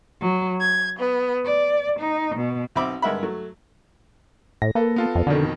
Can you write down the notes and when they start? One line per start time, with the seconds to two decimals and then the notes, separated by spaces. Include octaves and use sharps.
0.20 F#3
0.59 G#6
0.98 B3
1.45 D5
2.00 D#4
2.35 B2
2.75 B1 C4 E5 B5 D6
3.02 G2 G#3 A#4 E5 F#5 B5
3.23 F#3 A3
4.62 A2 A#6
4.75 A#3 A4 B4
4.96 B3 F4 A4
5.15 F2
5.27 F2 B2 D3 D#3